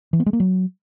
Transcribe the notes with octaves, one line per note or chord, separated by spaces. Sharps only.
E3
B3
G#3
A#3
F#3